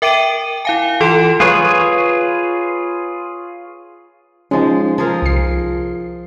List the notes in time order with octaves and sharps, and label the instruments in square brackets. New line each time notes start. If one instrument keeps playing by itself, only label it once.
[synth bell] A#4 E5 G5 D6 D7 D#7
E4 F5 G#5
E3 F4 A4 C6 D7 E7
[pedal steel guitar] F4 G#4 B4 C#5
[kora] F3 G#3 [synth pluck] C#4 D#4
[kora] F3 G#4 A#4
[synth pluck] C2 C7